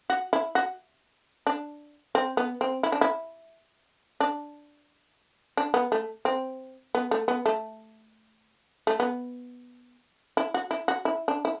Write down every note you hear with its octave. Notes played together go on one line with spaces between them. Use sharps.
F#4
E4
F#4
D4
C4
B3
C4
E4
D4
E4
D4
D4
B3
A3
C4
B3
A3
B3
A3
A3
B3
E4
F#4
E4
F#4
E4
D4
E4